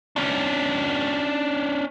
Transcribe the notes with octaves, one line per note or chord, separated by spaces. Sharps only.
C#4 D4